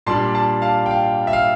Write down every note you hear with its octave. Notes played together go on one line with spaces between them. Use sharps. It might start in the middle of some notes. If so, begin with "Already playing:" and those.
A#2 G3 D4 A5 C6
A5 C6
F5 A5
G5
F5
E5
F5